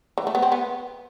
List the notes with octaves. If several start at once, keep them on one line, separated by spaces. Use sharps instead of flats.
E3
A3
B3
C4
B3